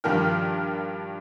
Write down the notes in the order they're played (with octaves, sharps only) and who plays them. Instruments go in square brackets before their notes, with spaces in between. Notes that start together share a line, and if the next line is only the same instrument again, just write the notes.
[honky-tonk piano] G2 D#3 F3 A#4 G5 F6